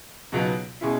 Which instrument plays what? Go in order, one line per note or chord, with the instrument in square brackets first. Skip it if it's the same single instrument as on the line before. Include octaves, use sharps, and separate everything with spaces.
[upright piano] C#2 B2 F#3 B3 D#4
B2 G#3 C#4 E4